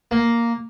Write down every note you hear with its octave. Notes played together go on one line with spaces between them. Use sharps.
A#3